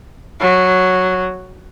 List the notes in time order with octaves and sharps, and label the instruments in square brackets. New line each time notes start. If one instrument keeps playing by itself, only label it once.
[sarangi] F#3